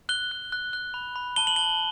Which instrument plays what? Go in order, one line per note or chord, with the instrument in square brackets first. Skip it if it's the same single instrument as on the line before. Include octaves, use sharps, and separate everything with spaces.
[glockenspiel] F#6 G7
F#6
F#6
F#6
B5
B5
A5 G7
F#7
A5 G7